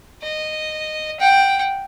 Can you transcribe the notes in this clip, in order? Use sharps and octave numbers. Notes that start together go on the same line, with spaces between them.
D#5
F#5 G5